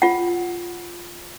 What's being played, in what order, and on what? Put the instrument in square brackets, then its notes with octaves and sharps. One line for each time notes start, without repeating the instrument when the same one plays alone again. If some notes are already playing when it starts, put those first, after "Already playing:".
[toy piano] F4 F#5